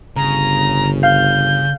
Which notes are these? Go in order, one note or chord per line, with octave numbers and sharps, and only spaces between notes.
G1 C#3 A#5
F5 G6